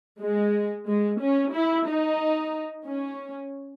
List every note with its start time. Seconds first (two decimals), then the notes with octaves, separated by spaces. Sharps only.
0.20 G#3
0.87 G#3
1.20 C#4
1.53 E4
1.87 D#4
2.87 C#4